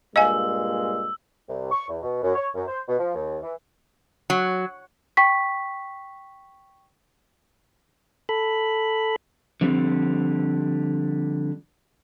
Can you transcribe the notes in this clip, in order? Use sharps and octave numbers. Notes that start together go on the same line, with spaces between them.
G2 A#2 G#3 D#5 F5 G#5 E6
C2
C#6
E2
B2
F#2
C#5
F#2
C5
B2
F3
D#2
E3
F#3
G5 C#6 B6
A4 B5
D3 F3 G3 C4